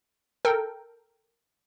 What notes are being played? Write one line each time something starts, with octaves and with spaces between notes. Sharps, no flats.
A4 A#4 G5